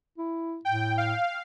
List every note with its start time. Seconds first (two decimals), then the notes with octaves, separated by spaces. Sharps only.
0.18 E4
0.65 A2 G5
0.98 F5